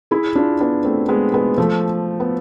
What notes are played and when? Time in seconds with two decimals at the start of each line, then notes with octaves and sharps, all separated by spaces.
0.11 E4 G#4
0.35 D4 F4
0.60 B3 D4
0.84 A3 C4
1.09 G#3 B3
1.34 G#3 B3
1.58 F3 A3
2.20 B3